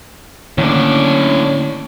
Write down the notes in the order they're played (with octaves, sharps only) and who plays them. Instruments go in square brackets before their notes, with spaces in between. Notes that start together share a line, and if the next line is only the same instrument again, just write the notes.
[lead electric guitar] A2 D4 [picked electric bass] D3 D#3 A#3 [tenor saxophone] C#4